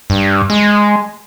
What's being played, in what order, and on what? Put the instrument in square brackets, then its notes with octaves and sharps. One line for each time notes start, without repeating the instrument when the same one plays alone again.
[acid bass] G2
G#3